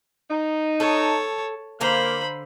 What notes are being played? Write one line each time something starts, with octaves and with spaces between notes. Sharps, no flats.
D#4
A4 C#5 A5
D3 A#3 C5 F5 A#5 B5